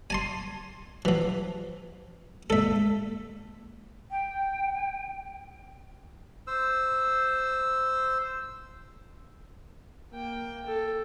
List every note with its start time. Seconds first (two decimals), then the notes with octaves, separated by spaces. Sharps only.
0.10 G#5 A5 C6
1.05 E3 F3
2.50 G#3 A#3 A4 E5
4.11 G5
6.47 C5 E6
10.12 A#3 G5
10.66 A4